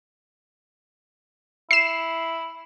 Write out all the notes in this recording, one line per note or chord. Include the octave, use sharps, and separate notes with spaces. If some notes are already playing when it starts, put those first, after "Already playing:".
E4 C7 E7